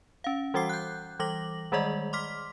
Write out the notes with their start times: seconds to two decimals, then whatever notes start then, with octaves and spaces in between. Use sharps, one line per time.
0.24 C#4 F5
0.54 E3 G3 F#4 F#5 D6 C7
0.69 F#6 G6
1.19 E3 G3 D6 A#6 F#7
1.72 D#3 G3 G#3 G#4 D5 D#5
2.13 C6 D6 F6 B6